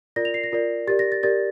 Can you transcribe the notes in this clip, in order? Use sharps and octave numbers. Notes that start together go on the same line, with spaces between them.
F4 A#4 D5 A#6
F7
C7
A#6
F4 A#4 D5
G4 A#4 D5 A6
A#6
A6
G4 A#4 D5 A6